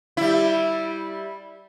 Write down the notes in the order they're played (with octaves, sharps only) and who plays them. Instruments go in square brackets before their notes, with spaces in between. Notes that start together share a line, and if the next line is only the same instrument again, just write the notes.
[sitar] G3 E4